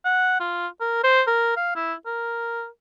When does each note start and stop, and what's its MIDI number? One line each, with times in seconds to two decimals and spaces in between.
0.05 0.40 78
0.40 0.67 65
0.81 1.01 70
1.04 1.22 72
1.27 1.52 70
1.57 1.74 77
1.76 1.94 64
2.06 2.67 70